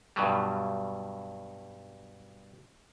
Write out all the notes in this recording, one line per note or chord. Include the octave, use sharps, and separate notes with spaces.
G2 B2 F#3 G3